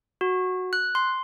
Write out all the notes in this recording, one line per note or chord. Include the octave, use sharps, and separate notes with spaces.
F#4
F#6
C6